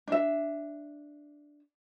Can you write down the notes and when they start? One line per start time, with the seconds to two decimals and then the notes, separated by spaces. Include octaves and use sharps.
0.08 D4 E5